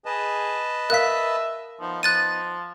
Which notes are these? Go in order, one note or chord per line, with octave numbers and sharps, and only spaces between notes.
G#4 B4 D#5 A5
A#4 E5 F5 F#6 B6
F3 B3 D#4
F3 F#6 A6 D#7